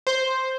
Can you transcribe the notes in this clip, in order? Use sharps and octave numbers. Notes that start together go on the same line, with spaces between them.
C5